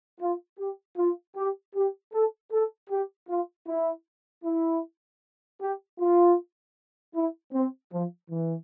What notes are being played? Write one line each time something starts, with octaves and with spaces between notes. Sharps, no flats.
F4
G4
F4
G4
G4
A4
A4
G4
F4
E4
E4
G4
F4
E4
C4
F3
E3